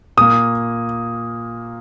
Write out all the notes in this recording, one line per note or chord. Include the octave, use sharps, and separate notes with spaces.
A#2 A#3 D#6